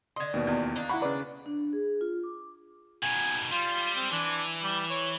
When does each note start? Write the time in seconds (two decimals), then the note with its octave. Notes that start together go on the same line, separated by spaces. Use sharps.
0.16 D3 D#5 C6 G#6
0.34 D#2 B2
0.47 E2
0.76 D#3 A#3 D4
0.89 E4 F#5 B5 C#6
1.02 C#3 B4 D5
1.46 D4
1.73 G#4
2.01 F4
2.23 D6
3.03 B2 D#3 G#5
3.52 G3 F4
3.96 C4
4.11 E3 D4
4.63 G3
4.90 C#5